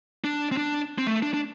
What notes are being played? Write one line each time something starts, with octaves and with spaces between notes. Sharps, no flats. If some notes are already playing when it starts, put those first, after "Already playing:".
D4
C4
D4
C4
A3
D4
D4